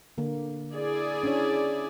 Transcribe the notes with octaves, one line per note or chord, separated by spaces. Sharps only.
D3 A#3
E4 G#4 D5
C#4 D4 C#5